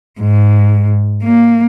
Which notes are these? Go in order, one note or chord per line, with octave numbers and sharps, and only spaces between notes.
G#2
A#3